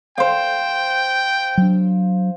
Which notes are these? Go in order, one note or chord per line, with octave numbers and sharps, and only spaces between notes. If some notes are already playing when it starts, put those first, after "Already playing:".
C5 F5 G5
F#3 D4